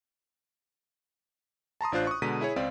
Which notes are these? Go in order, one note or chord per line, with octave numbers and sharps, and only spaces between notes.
A5 A#5 C6 D#6
A1 D4 F4 C5 F#6
C#6 D#6
B2 D3 G#3 A#5 B6 D#7
E4 G#4 C#5
C#2 C4 D5 F5